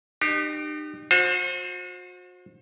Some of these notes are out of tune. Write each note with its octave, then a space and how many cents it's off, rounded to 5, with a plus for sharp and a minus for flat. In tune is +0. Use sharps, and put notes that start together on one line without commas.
D#4 -40 G4 +0
F#4 -40 C5 +20